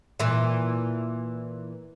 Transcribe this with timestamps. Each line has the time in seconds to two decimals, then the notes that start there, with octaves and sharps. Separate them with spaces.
0.20 A#2 E3